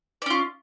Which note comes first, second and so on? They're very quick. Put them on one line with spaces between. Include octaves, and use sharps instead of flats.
D5 C#4 F4